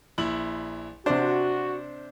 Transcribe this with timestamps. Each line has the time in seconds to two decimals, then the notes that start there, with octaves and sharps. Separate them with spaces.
0.18 A#1 E4 F#7
1.06 C3 D4 F#4 C5